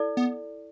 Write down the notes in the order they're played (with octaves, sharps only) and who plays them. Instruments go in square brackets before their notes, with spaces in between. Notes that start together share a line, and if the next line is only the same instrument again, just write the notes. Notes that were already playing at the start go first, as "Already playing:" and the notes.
Already playing: [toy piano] E4 A4 D5
[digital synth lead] B3